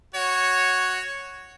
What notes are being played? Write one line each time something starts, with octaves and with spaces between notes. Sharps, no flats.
F#4 C#5